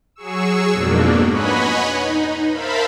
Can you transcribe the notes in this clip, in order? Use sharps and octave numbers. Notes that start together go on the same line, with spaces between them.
F#3 G#4 C#6 E6
F2 G#2 B2 A#3 D4
B4 C#5 D#5 F#5 G#5 B5
D#4
A#4 C5 E5 F5 A5 B5